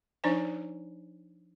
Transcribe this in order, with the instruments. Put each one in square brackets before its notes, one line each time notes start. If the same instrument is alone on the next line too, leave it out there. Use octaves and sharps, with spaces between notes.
[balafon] F3 D4 D#4 C5 D5 G#5